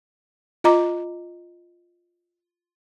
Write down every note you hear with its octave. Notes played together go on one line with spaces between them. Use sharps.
F4 D#5 A#5 D6